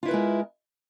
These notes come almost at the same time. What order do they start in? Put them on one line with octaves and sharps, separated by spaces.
F4 E4 B4 A#4 G#3